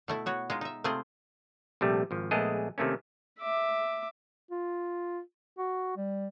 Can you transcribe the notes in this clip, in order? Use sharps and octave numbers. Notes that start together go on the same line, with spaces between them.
B2 A3 E4
B3 F#4 C#5
G#3 D#4 F4
D#4 E5
C3 A3 C4 F4 G#4 C5
A#1 C3 G3 A3
G#1 F3
A#1 G#3 A3 B3 G#4 D#5
C3 D#3 A3 A#3 C#4
E5 D6
F4
F#4
G3